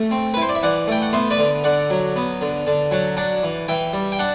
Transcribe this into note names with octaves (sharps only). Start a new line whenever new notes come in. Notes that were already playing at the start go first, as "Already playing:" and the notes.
Already playing: A3
C4
B4
E4 C5
D5
E5
E3 D5 F#5
A3 G5
F#5
B3 C5 E5
B4 D5
D3
D3 D5 F#5
F#3
B3
D3
D3 A5
F#3 F#5 A5
D4 F#5 A5
E3
E3 E5 G5
G3
G5
D4 F#5 A5